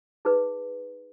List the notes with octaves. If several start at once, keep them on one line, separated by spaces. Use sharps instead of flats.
D#4 G#4 B4